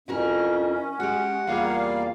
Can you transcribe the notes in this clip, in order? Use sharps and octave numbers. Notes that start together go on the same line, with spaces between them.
F2 C#4 E4 F#4 A#4
G#3 F#4 G4 F#5
E2 G3 A#3 F4 G#4 F5
D5